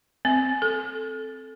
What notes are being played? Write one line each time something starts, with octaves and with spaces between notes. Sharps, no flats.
C4
A4